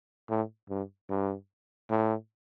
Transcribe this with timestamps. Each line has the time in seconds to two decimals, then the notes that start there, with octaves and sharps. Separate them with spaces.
0.30 A2
0.70 G2
1.09 G2
1.90 A2